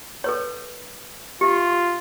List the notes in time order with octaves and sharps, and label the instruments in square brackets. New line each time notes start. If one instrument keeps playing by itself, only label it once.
[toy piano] A4 B4 C#5
[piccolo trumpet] F4 [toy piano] G4 E5